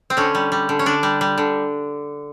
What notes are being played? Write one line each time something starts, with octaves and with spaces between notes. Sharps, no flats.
C4
D3 C#4
G3
G3
D3
C#4
D3 D4
G3
G3
D3